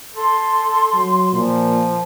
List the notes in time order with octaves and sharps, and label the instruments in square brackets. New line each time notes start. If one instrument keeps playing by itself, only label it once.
[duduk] A4 [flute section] C6
[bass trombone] F#3
[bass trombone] A#2 [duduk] F3